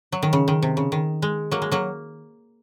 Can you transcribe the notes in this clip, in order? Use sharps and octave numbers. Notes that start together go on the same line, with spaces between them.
F#3
D#3
C#3
D#3
C3
C#3
D#3
G#3
F#3 A#3
G#3
F#3 A#3